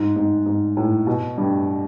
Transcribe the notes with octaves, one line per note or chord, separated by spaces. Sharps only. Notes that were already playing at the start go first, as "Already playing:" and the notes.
Already playing: G#2
G#2
G#2
A2
B2
G2